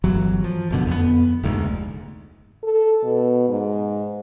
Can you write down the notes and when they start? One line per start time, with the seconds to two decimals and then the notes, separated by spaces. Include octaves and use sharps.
0.04 G1 E3 F#3
0.44 F3
0.70 F#1 B2 D3
0.87 F2 B3
1.43 F1 D2 G#2
2.64 A4
3.03 B2
3.49 G#2